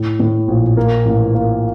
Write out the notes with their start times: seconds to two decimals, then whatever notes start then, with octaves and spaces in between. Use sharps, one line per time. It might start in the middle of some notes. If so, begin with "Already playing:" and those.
Already playing: A2
0.20 A2
0.48 A#1
0.77 A#3
1.06 A1
1.35 A#3